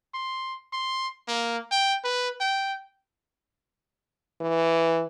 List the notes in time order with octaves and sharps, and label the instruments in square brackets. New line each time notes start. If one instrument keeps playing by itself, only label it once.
[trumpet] C6
C6
A#3
G5
B4
G5
[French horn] E3